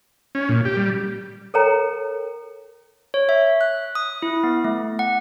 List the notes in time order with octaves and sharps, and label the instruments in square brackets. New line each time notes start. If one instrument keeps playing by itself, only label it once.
[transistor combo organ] C#4
A#2
G4
G3
[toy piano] A4 A#4 C#5 G5 A#5
[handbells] C#5
E5
F#6
D#6
E4
B3
A3
F#5